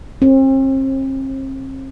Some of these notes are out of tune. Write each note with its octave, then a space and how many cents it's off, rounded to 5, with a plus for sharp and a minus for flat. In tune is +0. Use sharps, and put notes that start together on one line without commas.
C4 +40